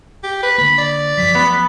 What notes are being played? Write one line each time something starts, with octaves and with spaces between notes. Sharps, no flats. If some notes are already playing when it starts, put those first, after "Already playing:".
G4
B4
D3 A#3 B5
D5
F#2 F3 F#3 B6
B3